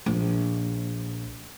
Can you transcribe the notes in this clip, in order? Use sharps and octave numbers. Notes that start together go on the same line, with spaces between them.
A#1